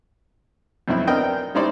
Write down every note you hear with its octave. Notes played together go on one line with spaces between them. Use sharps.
F2 B2 F#3 C4 E4
B3 C4 D4 A#4 D#5 G5
G3 C#4 D#4 E4 C5 D5